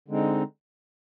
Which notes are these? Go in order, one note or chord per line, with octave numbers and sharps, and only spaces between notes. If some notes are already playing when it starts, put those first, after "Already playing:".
D3 G#3 C4 D#4